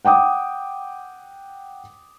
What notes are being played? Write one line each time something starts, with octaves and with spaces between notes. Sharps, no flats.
F#5 G5 D6 D#6